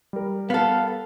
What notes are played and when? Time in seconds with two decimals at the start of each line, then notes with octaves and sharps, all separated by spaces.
0.13 G3 A#4
0.50 B3 A4 F5